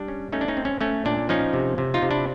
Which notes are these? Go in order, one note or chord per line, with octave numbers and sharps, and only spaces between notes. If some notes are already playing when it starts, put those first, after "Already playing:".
Already playing: G3 D4
C#4
A3 C#4 D#4
D4
C#4 D#4
C4
C#4
A3 C#4
A#2 D4
F3 C#4 D#4
C3
C3
D#4 F4
C3
D4 E4